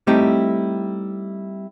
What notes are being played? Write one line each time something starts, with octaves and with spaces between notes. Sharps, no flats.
G3 A3 C4 D#4 E4 G4